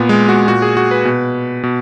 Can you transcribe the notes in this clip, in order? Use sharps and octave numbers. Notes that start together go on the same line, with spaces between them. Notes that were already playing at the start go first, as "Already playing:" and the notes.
Already playing: A#2 B3
G#3
F#4
A#2 F#4
G#4
F#4
B4
B2
B2